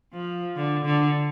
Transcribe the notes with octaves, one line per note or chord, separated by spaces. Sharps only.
F3
D3
D3